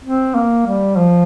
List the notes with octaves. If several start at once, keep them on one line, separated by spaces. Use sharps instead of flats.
C4
A#3
G3
F3